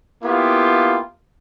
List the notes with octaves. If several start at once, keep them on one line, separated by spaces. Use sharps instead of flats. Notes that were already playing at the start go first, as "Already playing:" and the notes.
A#3 B3 E4 F4 G4